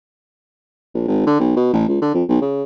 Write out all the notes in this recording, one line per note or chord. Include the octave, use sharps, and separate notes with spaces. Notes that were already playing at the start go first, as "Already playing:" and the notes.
A#1
G#1
D3
B1
B2
A1
C#2
D3
F2
B1
C#3